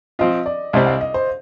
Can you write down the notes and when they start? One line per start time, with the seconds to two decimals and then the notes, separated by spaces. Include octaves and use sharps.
0.19 F3 C4 F4 D#5
0.46 D5
0.73 C2 C3 G3 C4 D#5
0.86 F5
1.01 D#5
1.14 C5